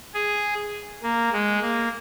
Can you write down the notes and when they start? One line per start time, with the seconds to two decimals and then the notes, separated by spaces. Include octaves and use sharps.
0.14 G#4
1.03 A#3
1.32 G#3
1.62 A#3